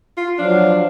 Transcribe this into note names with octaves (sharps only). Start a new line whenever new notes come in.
F4
F3 F#3 D4 F5